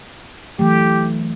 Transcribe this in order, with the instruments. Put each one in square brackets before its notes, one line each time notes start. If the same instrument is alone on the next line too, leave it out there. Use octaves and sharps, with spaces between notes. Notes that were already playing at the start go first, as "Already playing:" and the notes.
[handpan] E3 F#3 A3 [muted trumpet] G4